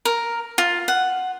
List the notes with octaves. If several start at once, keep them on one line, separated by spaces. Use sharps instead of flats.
A#4
F4
F#5